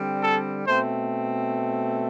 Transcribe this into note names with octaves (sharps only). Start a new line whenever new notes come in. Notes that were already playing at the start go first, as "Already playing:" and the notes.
Already playing: D3 G3 C4
A4
B2 A3 C4 C5